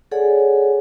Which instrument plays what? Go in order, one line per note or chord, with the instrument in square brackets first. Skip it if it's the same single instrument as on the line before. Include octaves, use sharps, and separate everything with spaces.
[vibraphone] G#4 A4 C#5 D5 F#5 G#5